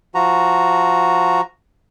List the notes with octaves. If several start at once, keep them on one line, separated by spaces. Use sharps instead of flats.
F3 F#4 A#5